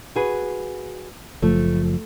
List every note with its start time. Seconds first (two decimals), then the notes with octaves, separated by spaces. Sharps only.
0.15 F#4 G#4 B4
1.42 F#1 F3 A3